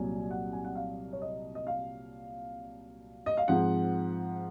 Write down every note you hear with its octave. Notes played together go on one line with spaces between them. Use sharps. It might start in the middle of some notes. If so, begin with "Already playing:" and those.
Already playing: C2 A#2 F#3 G#5
F#5
G#5
F#5
F5
C#5
D#5
D#5
F5
D#5
F5
G#2 F3 C4 F#5